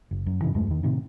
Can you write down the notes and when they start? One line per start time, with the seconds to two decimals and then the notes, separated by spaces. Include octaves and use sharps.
0.11 F#1
0.26 F#2
0.42 G#2 C#3 E3
0.54 D#1 F#2 G#3 A3
0.67 E2 D#3
0.83 A2 C3 D#3